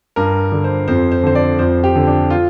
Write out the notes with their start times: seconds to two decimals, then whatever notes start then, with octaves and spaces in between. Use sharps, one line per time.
0.16 G2 A#4
0.52 D3
0.64 C5
0.88 F2 C5
1.12 C5
1.23 D3 C5
1.35 D5
1.59 F2 C5
1.84 G4
1.96 D3
2.07 D4
2.30 F4